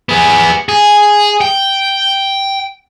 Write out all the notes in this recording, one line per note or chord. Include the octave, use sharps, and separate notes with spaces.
B3 G#4
G#4
G5